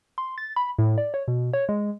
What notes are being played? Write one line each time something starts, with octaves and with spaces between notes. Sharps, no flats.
C6
A6
B5
A2
D5
C#5
B2
C#5
G#3